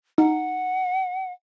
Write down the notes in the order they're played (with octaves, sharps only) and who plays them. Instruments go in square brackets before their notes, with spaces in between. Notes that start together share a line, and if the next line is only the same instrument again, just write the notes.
[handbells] D#4 [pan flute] F#5